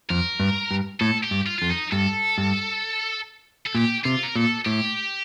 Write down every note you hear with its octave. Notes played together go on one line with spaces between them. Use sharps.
F2 A#4
G2
G2
A2 A4
G4
G2
F4
F2 F4
D#4
G2 A4
G2
A4
A#2 G4
C3 F4
A#4
A#2 A4
A2 G4